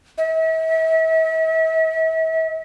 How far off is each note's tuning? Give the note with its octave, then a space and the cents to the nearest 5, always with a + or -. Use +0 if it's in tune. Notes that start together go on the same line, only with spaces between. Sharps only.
E5 -40